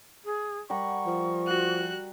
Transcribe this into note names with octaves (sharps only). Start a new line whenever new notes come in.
G#4
G3 A#4 F#5 C#6
F3
F#4 F#6